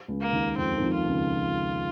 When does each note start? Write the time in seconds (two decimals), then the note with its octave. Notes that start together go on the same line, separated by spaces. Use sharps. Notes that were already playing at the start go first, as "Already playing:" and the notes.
0.08 C#2 C#3
0.21 A#3
0.32 D#2 D#3
0.57 F2 F3 C4
0.77 D#3
0.81 F2 F3
0.94 F4
1.06 C#2 C#3